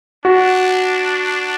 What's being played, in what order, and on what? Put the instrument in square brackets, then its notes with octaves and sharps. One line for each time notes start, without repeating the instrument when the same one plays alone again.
[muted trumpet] D4 [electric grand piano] F#4